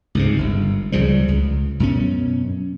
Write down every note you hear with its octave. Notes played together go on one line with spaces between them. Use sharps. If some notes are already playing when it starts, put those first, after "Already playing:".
C#2 G#2 C3
G1
C#2 C#3 F3 G3
C#2
F#2 B2 C#4